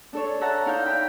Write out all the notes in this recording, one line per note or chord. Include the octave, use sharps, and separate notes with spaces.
D4 A4 C#5
A4 E5 F#5 A5 A#5
D#4 E4 F5 A#5 F6 G6
F5 G5 B5